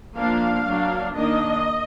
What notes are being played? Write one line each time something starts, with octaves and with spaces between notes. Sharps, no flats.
F3 A#3 D4 F5
F#3 A#3 D4
D#3 A#3 D4 D#5